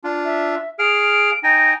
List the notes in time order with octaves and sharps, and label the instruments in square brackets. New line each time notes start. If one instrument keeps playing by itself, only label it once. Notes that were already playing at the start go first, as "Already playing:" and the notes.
[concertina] D4 F4
[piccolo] E5
[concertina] G#4 F5 F6 [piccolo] D7
[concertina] D#4 G5 G#5 [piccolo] A#6